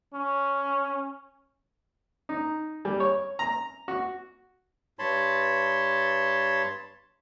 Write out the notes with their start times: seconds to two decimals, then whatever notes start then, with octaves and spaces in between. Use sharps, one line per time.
0.14 C#4
2.29 D#4
2.85 G3
3.00 C#5
3.39 A#5
3.88 F#4
4.99 G2 C#5 A5 B5 C6